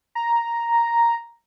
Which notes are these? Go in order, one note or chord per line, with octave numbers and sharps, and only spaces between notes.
A#5